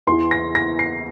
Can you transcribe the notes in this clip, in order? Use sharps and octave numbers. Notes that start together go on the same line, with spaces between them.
E2 E3 C6
A#6
A#6
C7